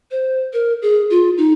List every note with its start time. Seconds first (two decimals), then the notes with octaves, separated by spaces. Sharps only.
0.11 C5
0.53 A#4
0.82 G#4
1.10 F4
1.38 D#4